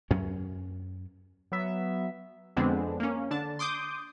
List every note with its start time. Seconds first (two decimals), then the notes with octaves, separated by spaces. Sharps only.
0.11 F#2 F#3 C#4
1.52 F#3 B3 E5
2.56 F2 D3 G#3 B3 C4 D4
3.00 A#3 C#4
3.31 D3 D4 A5
3.59 C6 D6 D#6 G6